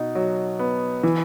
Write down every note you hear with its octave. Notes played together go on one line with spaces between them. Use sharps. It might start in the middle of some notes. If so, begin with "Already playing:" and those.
Already playing: B2 D#4
F#3
B3
E3